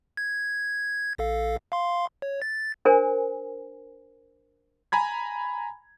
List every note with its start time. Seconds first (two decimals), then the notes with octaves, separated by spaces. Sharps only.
0.17 G#6
1.18 A#1 A4 F5
1.72 F5 C6
2.22 C#5
2.42 A6
2.85 D4 A#4 C5 G#5
4.92 G#5 A#5 B5 G#6